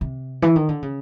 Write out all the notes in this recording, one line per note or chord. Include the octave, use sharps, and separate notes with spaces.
C3
E3
D#3
D3
C#3